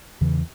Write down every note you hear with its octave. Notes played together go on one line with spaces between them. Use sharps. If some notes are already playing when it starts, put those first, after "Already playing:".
E2 C#3 E3